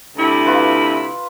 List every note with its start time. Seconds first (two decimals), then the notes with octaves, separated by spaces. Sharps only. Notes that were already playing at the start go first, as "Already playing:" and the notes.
0.17 D2 C3 E4
0.46 F4 B4